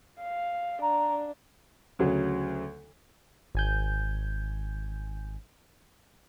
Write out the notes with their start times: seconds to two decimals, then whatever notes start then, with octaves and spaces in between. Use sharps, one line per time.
0.19 F5
0.82 D4 A#5
1.99 D2 C#3 F#3
3.55 G#1 G#5 G6